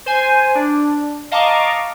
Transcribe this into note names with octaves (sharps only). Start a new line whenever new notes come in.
C5 G#5
D4
D#5 F5 A5 A#5 C#6 D6